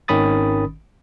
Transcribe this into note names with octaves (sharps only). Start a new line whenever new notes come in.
G#1 D#3 C#4 B5 D#6 A6